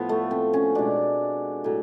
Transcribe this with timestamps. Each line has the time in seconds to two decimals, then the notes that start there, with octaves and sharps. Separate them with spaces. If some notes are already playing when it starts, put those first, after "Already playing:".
Already playing: A2 F3 B3
0.09 A3
0.31 C4
0.53 C#4
0.75 B2 G#3 D4
1.64 A2 F#3